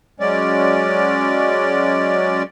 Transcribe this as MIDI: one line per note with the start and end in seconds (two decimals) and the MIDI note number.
0.20 2.43 54
0.20 2.43 56
0.20 2.43 61
0.20 2.43 74